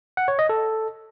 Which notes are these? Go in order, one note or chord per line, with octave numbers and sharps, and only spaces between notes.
F#5
C#5
D#5
A4